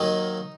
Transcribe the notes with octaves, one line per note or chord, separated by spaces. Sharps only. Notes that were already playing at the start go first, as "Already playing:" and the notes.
Already playing: D#2 D#3 F#3 A#3 D#4